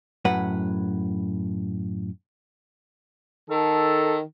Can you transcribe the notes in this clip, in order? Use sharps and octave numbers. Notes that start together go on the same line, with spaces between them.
F#2 A2 B4 F#5
D#3 A4